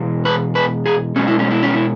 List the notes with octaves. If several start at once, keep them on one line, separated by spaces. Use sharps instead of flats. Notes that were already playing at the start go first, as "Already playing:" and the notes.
Already playing: E2 B2 G#3
B4
B4
G#4
B2 G#3 C#4
E4
C#4
E4
C#4
E4